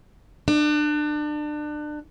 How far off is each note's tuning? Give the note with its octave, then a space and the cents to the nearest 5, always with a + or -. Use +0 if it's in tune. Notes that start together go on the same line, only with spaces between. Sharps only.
D4 +30